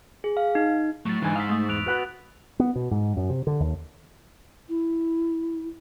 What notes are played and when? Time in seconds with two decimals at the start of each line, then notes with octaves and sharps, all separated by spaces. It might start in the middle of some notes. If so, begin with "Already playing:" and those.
0.24 G#4
0.37 F5
0.55 D#4
1.05 A2 F#3 C#6 A6
1.22 G#2 D3 E3 G#5
1.36 F5 D#6 E6 B6
1.49 A3 D#6 A6
1.69 E2 F#6 D7 F7
1.86 F#4 B4 F#5
2.60 B3
2.76 B2
2.91 G#2
3.17 F#2
3.30 C3
3.47 D3
3.60 D#2
4.69 E4